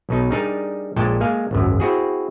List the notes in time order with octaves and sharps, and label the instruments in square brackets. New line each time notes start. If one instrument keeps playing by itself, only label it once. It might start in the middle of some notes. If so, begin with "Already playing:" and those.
[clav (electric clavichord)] B1 B2 D#4
G3 D4 D#4 G#4 A#4
A#1 A#2 G#3 G5 A5
G#3 A#3 F5 G#5
G#1 C#2 F#2
C4 E4 F#4 G#4